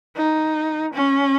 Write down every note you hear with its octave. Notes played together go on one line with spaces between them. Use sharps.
D#4
C#4